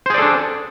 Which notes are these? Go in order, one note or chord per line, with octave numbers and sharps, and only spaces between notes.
D4 G#4 A4 C5 D5